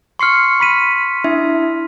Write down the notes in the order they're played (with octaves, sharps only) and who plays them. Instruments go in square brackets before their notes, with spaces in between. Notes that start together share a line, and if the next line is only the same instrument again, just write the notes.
[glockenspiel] C6 F6 [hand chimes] C#6 C7 C#7
[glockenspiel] B5 B6 D#7
[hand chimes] D4 E4 E5